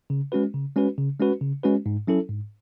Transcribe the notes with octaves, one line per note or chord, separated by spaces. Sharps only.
C#3
G#3 C#4 F#4 B4
C#3
G#3 C#4 F#4 B4
C#3
G#3 C#4 F#4 B4
C#3
G#3 C#4 F#4 B4
G#2
F#3 C#4 E4 A4
G#2